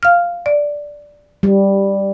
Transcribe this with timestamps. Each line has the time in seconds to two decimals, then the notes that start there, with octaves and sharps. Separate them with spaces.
0.03 F5 F6
0.46 D5
1.43 G3